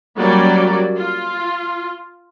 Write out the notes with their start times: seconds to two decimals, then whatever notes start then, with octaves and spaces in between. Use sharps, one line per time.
0.17 F#3 G3 A#3 C#4 D5
0.97 F4